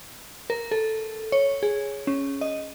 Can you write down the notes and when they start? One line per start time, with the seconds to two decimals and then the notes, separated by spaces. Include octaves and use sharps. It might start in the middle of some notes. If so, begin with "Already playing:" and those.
0.50 A#4
0.71 A4
1.32 C#5
1.63 G#4
2.07 C#4
2.41 D#5